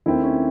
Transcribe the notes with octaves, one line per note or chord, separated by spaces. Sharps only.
D#2 D#3 A3 C4 E4
C#4